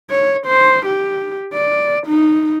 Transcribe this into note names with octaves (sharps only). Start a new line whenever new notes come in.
C#5
C5
G4
D5
D#4